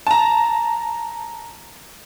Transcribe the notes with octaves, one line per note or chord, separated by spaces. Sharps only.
A5 A#5